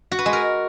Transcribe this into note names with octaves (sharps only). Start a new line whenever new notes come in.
F#4
B4
G#3
A#4